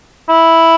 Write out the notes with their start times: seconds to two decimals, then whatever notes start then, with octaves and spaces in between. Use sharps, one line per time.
0.29 E4